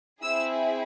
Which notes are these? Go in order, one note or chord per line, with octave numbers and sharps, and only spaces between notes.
C4 E4 G#4 E6